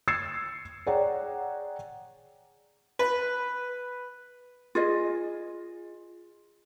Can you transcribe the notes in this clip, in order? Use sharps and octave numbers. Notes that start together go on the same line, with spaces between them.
E6 G#6 A6 C7 C#7 E7
G#4 C#5 D5 F#5 G5 A#5
B4
F4 G#4 D#5